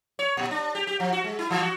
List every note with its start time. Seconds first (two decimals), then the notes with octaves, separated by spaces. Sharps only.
0.19 C#5
0.37 A#2
0.51 D4
0.75 G4
0.87 G4
1.00 F3
1.13 F#4
1.24 G#3
1.39 E4
1.51 E3
1.62 F#4